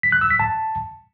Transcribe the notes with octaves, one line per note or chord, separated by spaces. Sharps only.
B6
F#6
E6
B6
A5